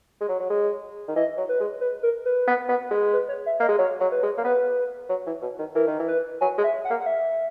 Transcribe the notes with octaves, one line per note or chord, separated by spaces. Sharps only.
G#3
F#3
F#3
G#3
D#3
E3 D#5
F#3
B4
G#3
B4
A#4
B4
B3
B3
G#3
B4
C#5
E5
A#3 D#5
G#3
F#3 C#5
F#3
B4
G#3
A#3
B3 B4
F#3
E3
B2
D#3
E3 A#4
D#3
E3
B4
F#3 G#5
G#3
E5
F#5
A#3
F#5
E5